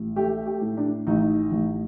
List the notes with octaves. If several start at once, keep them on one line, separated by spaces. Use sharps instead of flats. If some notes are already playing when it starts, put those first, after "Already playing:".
Already playing: A1
A3 G4
G4
A2
D4
A1 D#4
A1